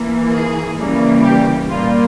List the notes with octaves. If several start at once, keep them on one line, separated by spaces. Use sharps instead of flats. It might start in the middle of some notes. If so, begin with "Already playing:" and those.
Already playing: E3 A#3
G#4
C#3 E3 G3 A#3
G4
A#2 G3 A#3 F4